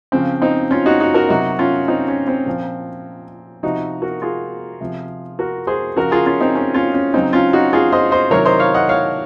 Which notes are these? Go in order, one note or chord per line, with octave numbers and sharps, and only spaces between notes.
C#3 F3 C4
C4 D#4
C#4 F4
D#4 F#4
D#4 F#4
F#4 A#4
C3 F#3 D#4 F#4
C#4 F4
C4 D#4
C#4
C4
A#2 F3
C3 F3 D#4 F#4
F#4 A#4
F4 G#4
C3 F3
F#4 A#4
G#4 C5
C#3 F3 F#4 A#4
F4 G#4
C#4 F4
C4 D#4
C#4
C#4 F4
C#4
C#3 F#3 C4 D#4
C#4 F4
D#4 F#4
F4 G#4
C5 D#5
C5 D#5
C3 D#3 F#3 A#4 C#5
C5 D#5
C#5 F5
D#5 F#5
C#5 F5